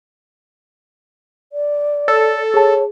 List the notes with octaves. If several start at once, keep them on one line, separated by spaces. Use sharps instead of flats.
D5
A4 C#5
G#4 C#5 A5